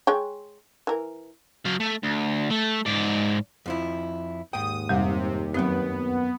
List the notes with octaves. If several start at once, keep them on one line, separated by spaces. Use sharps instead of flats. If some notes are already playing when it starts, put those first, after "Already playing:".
G#3 C#5 G5
E3 A#4
F#3 F5
A3
D2
A3
G#2 D5
F2 F3 E4
D#2 G#2 G5 D#6
F2 C3 G3
F#2 D#3 F#3 B3 C4